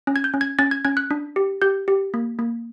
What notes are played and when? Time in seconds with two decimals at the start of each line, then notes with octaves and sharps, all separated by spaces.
0.07 C#4
0.16 G#6
0.24 G6
0.34 C#4
0.41 G#6
0.59 C#4 A6
0.71 G#6
0.85 C#4 G#6
0.97 F#6
1.11 D4
1.36 G4
1.62 G4 G6
1.88 G4
2.14 A#3
2.39 A#3